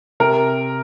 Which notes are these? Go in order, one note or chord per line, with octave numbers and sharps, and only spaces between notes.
C3 A#4